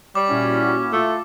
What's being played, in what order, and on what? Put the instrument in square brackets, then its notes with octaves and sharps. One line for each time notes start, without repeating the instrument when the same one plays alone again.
[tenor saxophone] G3 [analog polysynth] C#5 [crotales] D6
[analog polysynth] A#2 E4 F#4 [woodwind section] C#4
[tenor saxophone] A3 [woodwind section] F4 A4